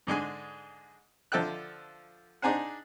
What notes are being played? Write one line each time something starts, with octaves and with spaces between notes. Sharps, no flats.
G#2 D3 G#3 G#5
D3 F3 A4 E5 G5 F#6
D4 D#4 G#4 C5 F#5